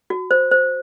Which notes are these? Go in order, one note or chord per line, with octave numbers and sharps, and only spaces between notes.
F#4
C5
C5